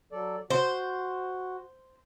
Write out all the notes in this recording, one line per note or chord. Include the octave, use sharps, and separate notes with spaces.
F#3 A4 D5
F#4 C5